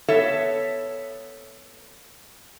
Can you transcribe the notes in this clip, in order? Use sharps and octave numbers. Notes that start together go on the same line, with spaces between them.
B3 A4 C#5 E5